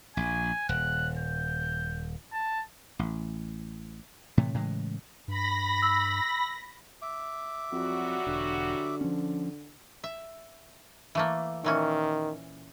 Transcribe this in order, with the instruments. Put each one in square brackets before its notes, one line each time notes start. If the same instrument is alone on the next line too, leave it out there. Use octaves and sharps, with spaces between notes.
[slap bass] A#1 [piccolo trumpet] G#5
[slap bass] D#1 [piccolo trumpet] F#6
[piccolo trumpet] G6
A5
[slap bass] A1
A2 C3 E3 A3
A2 C#3 E3 G#3
[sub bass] G2 [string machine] B5 A#6
[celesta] E6
[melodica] E5 D6
[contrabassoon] F2 [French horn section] F#3 G3 F#4
[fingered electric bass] E1 [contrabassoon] D3
[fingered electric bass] F3 C#4
[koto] E5
E3 A3 A#3
[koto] A#2 E3 C#4 [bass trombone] D#3